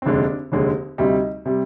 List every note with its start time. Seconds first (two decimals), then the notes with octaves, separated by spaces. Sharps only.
0.02 C4
0.06 F1 D#2 D3 G#3 D4
0.52 F1 D#2 D3 G#3
0.98 D2 C3 G3 D#4
1.46 C3 G3